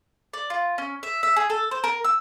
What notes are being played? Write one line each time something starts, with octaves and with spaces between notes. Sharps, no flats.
D5
F4
C#4
E5
E5
G#4
A4
C5
A#4
E6